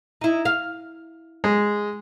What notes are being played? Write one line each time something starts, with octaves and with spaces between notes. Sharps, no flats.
D#4 E4
F5
G#3